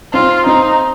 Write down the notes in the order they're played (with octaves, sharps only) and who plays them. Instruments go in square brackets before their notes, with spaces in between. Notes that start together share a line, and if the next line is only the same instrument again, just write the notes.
[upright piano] C4 [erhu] F4
[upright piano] C4 [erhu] D#4